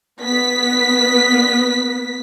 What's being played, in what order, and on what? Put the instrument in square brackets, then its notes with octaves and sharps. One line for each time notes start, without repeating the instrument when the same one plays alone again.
[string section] B3 B6